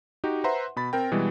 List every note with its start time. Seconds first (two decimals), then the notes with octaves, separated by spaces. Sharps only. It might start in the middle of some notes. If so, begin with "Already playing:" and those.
0.24 D#4 F#4 G4
0.44 B4 C5 E5 F#5 A#5 C6
0.76 B2 B5 A6
0.93 C4 A#4 G5
1.11 B2 E3 G3 G#3